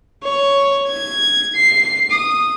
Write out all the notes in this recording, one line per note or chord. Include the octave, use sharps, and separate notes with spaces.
C#5
G#6
C7
D#6